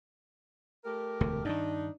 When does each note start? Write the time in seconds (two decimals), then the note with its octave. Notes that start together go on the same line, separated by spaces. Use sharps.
0.85 A3 G4 A#4
1.21 E1 D2 C3
1.45 G2 D#3 D4 D#4